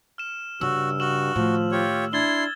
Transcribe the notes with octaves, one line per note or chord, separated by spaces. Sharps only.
F6 E7
G2 C#3 F#4 E6
F#4 F6 E7 F#7
A2 D#3 F3
F4 G4 C#5
D4 E4 C6 G#6 A6 G7